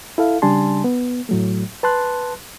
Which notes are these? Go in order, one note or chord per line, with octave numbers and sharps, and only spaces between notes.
E4 A4 F5
C#3 G3 D4 G#5 A5 C6
B3
A2 F#3 A3
B4 A5 C6 F#6